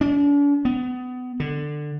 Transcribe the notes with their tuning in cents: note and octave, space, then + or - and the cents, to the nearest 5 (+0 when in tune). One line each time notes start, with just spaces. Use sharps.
D4 -45
B3 +25
D3 +15